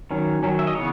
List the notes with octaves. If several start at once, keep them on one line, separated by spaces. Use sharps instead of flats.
D#3 F#3 C#4
D#3 F#3 C#4
E5
D#5
C#3 E3 B3 C#5